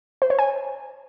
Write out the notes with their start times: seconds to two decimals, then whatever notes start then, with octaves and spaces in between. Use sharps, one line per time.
0.22 C5
0.30 C#5
0.39 G#5